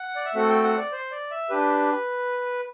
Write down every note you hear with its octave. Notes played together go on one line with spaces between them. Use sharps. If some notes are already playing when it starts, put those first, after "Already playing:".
Already playing: F#5
D5
E5
A3 C4 F#4 A4 F#5
G5
F#5
D5
C5
D5
E5
D4 G4 B4